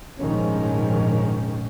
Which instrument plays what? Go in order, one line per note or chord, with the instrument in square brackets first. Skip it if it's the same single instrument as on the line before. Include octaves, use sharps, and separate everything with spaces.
[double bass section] F1 A#1 G#2 D#3 F3 C#4